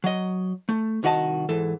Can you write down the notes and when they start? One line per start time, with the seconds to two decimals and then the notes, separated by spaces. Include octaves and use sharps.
0.04 F#3 D#5
0.69 A3
1.03 C2 D#3 F#4 D#5 A5
1.49 G#2 E3 A4